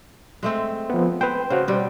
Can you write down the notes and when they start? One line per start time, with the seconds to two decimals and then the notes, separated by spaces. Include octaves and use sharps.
0.43 G#3 A3 C4
0.90 F3 B3
1.21 B4 C5 G5
1.50 C#3 F#4 C5
1.68 B2 G3 C4